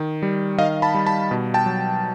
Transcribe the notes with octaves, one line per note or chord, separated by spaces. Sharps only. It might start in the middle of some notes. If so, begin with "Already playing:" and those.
Already playing: D#3
G3
D#3 D#5 F5
A5 B5
G3
A5 B5
B2
G5 A5
F#3